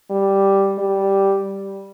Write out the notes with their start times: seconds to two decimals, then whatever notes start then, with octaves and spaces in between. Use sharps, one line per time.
0.11 G3
0.78 G3